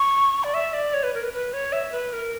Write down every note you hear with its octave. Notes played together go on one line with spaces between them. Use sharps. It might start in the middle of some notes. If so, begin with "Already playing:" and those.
Already playing: C#6
D5
E5
D5
C#5
B4
A#4
B4
B4
C#5
E5
B4
A#4